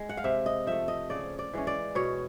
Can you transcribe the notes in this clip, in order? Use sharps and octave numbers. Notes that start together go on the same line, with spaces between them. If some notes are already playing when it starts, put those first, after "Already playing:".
Already playing: G#3
F#5
F5
C3 E5
D#5
F3 A3 E5
D#5
C#3 D5
D5
E3 G#3 C#4
D5
B2 C#5